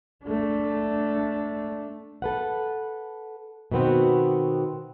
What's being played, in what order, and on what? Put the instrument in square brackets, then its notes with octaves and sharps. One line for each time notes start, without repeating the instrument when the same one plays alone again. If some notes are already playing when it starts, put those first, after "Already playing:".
[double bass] A3 D4
[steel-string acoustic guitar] A4 B4 F#5
B2 D#3 B3 C4 F#4